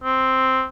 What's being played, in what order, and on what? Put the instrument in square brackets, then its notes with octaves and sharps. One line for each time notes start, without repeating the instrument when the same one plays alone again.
[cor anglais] C4